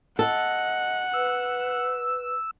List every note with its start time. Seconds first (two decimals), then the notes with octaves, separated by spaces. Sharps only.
0.19 A4 D#5 F#5
1.14 B4 E6